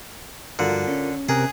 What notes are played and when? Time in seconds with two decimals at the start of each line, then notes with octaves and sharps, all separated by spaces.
0.59 G2 D3 F3 F4 F#4 A#4
0.88 C#4
1.29 C3 G#4 A#4 F#6